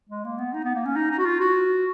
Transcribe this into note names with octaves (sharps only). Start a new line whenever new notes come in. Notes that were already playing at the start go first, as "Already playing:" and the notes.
G#3
A#3
B3
D#4
B3
A#3
C#4
D#4
D#4
F#4
F4
F#4